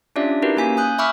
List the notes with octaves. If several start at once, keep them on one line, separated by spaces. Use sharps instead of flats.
C#4 D4 F4 G4 D5 E5
D#4 E4 F#4 G4 A#4 B4
A#3 C#4 G#5 B6
G#5 D#6 F#6 G6
E5 B5 C#6 D6 E6 F6